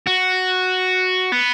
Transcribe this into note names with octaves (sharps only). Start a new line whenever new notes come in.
F#4
B3